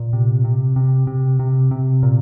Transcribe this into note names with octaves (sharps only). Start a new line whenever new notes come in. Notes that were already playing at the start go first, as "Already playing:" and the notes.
Already playing: A#2
C3
C3
C3
C3
C3
C3
A#2